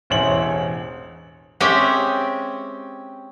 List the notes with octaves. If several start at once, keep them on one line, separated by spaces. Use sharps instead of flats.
E1 A1 C5 C#5 E5 F#7
G#3 C4 C#4 G4 E5